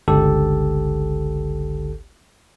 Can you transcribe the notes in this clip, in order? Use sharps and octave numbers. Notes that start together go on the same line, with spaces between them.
G1 C#2 D3 G4 A4